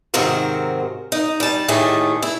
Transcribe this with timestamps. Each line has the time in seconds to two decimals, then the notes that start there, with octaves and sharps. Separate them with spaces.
0.14 G#2 C3 D#3 F#3 C4 A#4
1.12 D#4
1.40 G3 A5
1.68 D#2 A2 D#3 A3 G#4
2.22 E4